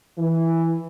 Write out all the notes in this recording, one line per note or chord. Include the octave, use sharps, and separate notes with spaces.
E3